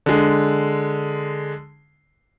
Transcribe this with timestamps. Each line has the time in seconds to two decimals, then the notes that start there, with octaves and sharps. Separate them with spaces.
0.06 D3 G#3